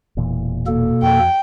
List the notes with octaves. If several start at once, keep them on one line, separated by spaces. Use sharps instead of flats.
E1 A#2 E3
B2 A#3 A4
F2 G5